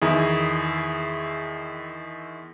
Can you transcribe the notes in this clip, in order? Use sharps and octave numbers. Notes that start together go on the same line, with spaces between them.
E2 D#3 E4 G#4